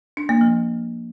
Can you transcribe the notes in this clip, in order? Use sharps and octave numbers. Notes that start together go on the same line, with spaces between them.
D4
A#3
F3